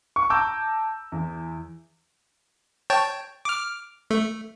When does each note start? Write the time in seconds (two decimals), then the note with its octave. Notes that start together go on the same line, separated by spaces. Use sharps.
0.16 C#6
0.30 A5 A#5 D6 E6 G6
1.12 E2
2.90 C#5 G5 A5
3.45 D6 F6
4.10 A3